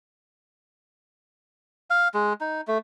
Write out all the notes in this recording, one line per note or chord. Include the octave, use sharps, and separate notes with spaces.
F5
G#3
D#4
A3